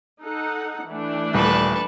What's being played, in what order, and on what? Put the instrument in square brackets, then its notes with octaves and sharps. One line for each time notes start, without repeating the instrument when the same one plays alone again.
[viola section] D#4 A4 F#5
E3 A3 D4
[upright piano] D#1 [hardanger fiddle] A4 B4